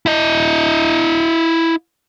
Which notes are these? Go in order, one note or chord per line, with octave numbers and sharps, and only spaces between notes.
E4 D#5